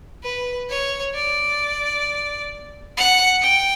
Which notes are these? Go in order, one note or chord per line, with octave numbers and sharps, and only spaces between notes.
B4
C#5
D5
F#5
G5